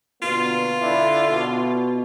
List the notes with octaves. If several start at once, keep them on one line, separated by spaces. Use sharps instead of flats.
B2 D3 A#3 F4
D3 D4 E4
B2